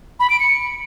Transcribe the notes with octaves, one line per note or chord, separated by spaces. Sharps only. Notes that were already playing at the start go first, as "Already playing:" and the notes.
B5
D7
C#7